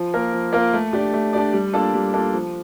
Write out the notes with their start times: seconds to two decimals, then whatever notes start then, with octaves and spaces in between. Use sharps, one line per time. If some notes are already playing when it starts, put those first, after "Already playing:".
Already playing: F3
0.14 A#3 F4 A#4
0.33 F3
0.53 A#3 F4 A#4
0.73 A3
0.93 D4 G4 D5
1.13 A3
1.33 D4 G4 D5
1.53 G3
1.73 A#3 D4 F4 A4
1.94 G3
2.13 A#3 D4 F4 A4
2.33 F3